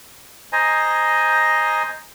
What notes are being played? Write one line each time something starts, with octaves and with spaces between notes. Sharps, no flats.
C5 D#5 G#5 A#5